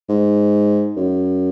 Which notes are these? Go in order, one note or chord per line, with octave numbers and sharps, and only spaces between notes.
G#2
F#2